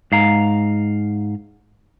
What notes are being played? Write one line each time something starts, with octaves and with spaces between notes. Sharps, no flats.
G#2 F5 A#5